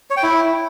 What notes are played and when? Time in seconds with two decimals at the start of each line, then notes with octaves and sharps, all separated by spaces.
0.10 C#5
0.17 G5
0.23 E4